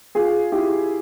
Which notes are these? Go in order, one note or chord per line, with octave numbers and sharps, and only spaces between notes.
F4 G#4
E4 G4